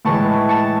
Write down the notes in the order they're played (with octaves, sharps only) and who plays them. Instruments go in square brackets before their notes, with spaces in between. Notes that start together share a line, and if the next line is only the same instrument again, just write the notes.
[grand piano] A2 E3 G#3 [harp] A5 C#6
[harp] A5 C#6